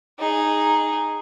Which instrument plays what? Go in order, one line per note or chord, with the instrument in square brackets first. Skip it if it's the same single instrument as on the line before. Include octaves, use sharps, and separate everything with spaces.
[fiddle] D#4 G#4